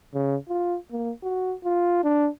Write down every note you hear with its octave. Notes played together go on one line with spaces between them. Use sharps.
C#3
F4
A#3
F#4
F4
D4